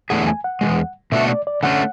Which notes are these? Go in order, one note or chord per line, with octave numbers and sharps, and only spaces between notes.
E2 D3 A3 E4 G#4 F#5
G#5
F#5
E2 C#3 G#3
B2 A3 D4 F#4 A4 E5
D5
D5
D3 A3 C#4 F#5